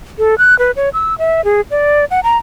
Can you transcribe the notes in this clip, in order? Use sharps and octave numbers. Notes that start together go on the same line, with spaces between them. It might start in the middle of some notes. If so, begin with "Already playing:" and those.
A4
F#6
B4
C#5
E6
E5
G#4
D5
F#5
A#5